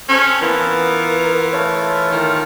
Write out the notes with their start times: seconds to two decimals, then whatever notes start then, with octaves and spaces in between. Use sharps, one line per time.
0.09 C4 C#4 A4 C5
0.42 E3 B3 F4 A#4
1.53 A3 F4 C#5
2.12 D#3